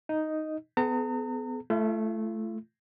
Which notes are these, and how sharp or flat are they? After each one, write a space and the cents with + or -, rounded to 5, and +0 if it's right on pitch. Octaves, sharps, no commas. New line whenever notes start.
D#4 +0 D#5 +0
B3 +30 G#4 +45 A#5 -40
A3 -10 F4 -45